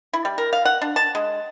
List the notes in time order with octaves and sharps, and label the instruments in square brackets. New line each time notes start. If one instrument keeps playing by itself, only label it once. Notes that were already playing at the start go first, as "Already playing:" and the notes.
[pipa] E4
G3
A#4
F5
F#5
D4
A5
G#3